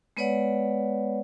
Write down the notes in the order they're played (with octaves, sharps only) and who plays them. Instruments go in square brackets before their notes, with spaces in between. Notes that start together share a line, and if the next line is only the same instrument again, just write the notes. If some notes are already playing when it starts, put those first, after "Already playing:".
[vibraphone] G#3 B3 B4 C#5 D5 F#5